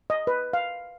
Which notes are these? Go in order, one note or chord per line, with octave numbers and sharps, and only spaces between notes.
D#5
B4
F5